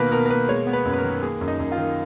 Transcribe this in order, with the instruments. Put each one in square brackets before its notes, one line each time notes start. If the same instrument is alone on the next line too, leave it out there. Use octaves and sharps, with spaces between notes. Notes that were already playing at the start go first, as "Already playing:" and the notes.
Already playing: [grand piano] B2 D#3 A#3 A#4 B4
B2 A#4
A#4
A#3 B4
G#3 C#5
B3
B4
F#2
B4
A#4
D#3
A#3 G#4
F#2
D#4
F#2
F4
D#3